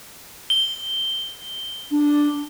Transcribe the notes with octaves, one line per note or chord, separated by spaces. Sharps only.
G7
D4